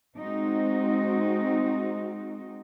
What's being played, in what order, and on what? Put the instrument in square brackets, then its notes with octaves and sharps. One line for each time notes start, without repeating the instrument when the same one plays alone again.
[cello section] G#3 C4 D#4 F#4